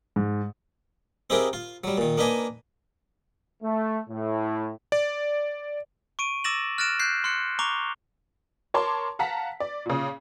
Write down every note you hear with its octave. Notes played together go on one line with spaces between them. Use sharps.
G#2
C4 D#4 E4 G4 G#4 A#4
F4
F#3 G3
A#2 D#3
A#3 D4 D#4 B4 D#5 G#5
A3
A2
D5
C#6 D7 D#7
D6 E6 A6 A#6 E7 F#7
F6 F#6 A6 A#6 D7 E7
F#6 G6 C7
C6 F6 F#6 C#7
A#5 C#6 D6 F7 G7
A#4 C#5 A5 C6 D6
F5 F#5 A5 A#5 B6
D5
A#2 C#3